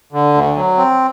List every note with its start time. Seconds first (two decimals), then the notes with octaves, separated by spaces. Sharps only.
0.12 D3
0.34 D2
0.56 F#3
0.77 C4